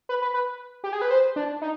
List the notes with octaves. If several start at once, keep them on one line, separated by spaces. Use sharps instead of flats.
B4
B4
B4
G4
G#4
B4
C5
D4
D#4